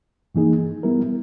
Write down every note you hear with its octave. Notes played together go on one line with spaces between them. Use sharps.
G2 E3 A#3 D#4 G#4
G3 B3 E4 A#4